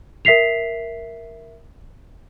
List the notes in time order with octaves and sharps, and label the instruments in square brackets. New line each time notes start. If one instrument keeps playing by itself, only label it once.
[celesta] A#4 E5 B6 C7 F7